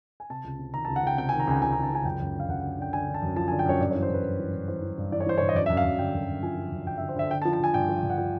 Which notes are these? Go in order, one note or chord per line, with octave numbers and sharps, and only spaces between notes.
G#5
C3 A5
C#2
C3
D#3 A#5
A5
C#2
F#5
C#2 G5
C3 G5
G#5
D#3
A#5
C#2 G#5
C#2 G#5
C#2 A#5
A5
C#2 G#5
F#2 G5
F#2
D3
F5
F#2 F#5
F#5
D3
D3 G5
D3 G#5
D3
A5
F#2
F3 A5
G#5
D3
G5
F#2 C#5
G2 D5
C#5
E3
C5
G2 B4
G2
E3
G2
E3 C5
E3
G2
E3 D5
C#5
E3 C5
C#5
G2
D#5
F#2 D5
E5
F#2
F5
F#2
D3 G5
F#2
F#2
F3 G#5
F3
F#2
F#2 G5
E5
D3
C5
D3 E5
D3 G5
A5
F3
A5
D3 G#5
G2 G5
F3
G2
F#5
F3 G5